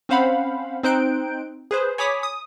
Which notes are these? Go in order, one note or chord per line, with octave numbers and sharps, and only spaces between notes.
C4 C#4 C5 F5 F#5 B5
C4 D#4 C5 F#6 G6 D7
G#4 B4 C5
C#5 G#5 B5 D6 D#6 B6
D#6